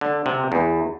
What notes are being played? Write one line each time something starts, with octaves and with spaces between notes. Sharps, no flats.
D3
C3
E2